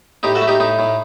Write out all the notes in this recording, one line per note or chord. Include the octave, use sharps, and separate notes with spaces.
A2 D#4 G4
F#4 A4
A3
D#4 G4
A2 D#4
A2